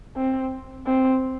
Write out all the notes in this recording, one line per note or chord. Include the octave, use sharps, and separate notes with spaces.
C4
C4